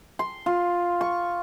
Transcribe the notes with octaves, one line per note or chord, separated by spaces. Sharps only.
C6
F4
C#6